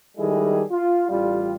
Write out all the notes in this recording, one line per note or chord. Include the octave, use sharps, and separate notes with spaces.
D#3 G3 G#3 E4 G#4 A4
F4
A1 G3 F4